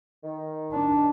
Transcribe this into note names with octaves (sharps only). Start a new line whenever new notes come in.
D#3
D4